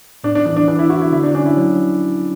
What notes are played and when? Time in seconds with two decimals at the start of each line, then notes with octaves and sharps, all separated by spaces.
0.24 A2 D4
0.35 D4
0.46 E3 D4
0.56 D4
0.68 E3 D4
0.79 E4
0.90 E4 F#4
1.02 E4
1.12 D3 E4
1.23 D4
1.35 C#4 D4
1.46 E4
1.57 F#3